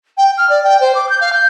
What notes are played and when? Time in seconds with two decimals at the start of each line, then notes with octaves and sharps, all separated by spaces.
0.17 G5
0.37 F6
0.49 D5
0.63 G5
0.80 C5
0.94 D6
1.09 G6
1.20 F5
1.32 G6